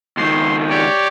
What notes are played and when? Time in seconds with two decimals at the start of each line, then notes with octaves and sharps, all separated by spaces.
0.17 C#2 D#3 C6
0.70 G4 C#5 D5